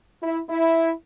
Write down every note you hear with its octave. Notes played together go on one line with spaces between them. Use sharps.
E4
E4